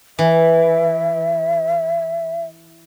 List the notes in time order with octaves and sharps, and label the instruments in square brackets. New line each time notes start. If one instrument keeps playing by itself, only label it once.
[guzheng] E3 [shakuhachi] E5